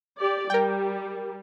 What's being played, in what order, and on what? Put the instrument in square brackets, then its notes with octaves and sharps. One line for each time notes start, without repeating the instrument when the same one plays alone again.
[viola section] G4 D5
[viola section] G3 [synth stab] A#4 G5